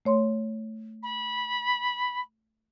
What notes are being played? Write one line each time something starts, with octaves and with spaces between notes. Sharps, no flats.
A3 C#5 C6
B5